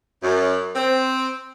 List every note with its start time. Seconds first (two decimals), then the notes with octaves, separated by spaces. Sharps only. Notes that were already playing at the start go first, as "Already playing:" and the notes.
0.23 F#2
0.75 C4